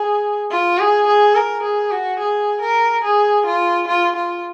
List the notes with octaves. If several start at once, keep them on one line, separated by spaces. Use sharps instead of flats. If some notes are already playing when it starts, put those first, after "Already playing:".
Already playing: G#4
F4
G#4
G#4
A#4
G#4
F#4
G#4
A#4
G#4
F4
F4
F4